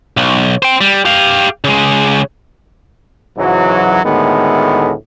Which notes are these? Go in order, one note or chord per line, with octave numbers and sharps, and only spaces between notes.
B1
C5 G5
G3
G4 F5
C#3 G#3
C#2 G#2 E3 F#3
D2 A2 D#3 G#3 B3